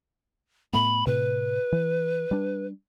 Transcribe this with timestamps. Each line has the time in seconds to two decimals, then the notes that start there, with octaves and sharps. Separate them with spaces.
0.73 A2 A3 B3 B5
1.07 A2 C3 B4
1.72 E3
2.31 G3 D4